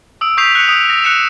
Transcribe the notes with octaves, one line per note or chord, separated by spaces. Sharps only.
D#6 E6 D7
C#6 D#6 G6 B6 C7 F7
F#6 C#7 F7
D#6 D7 F7
A#6
F#6 C#7 E7